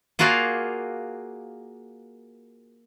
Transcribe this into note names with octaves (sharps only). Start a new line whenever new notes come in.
A#3 F4 F#4 G#4 D5 F5